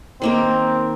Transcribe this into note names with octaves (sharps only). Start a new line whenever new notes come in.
D#3 A#3 C4 A#4